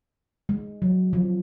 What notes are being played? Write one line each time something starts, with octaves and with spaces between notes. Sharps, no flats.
G#3
F#3
F3